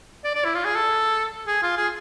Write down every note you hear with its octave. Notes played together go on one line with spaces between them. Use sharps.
D5
D5
E4
F4
G#4
A4
G#4
F4
G#4